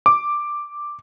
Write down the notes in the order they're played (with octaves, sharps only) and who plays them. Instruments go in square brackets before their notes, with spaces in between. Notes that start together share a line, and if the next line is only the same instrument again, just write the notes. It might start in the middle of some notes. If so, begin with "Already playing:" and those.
[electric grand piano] D6